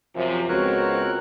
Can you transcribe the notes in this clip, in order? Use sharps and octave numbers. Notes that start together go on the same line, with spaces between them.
F#2 C3 F3
C#2 B3 C4 F#4 A#4 C#5 F#6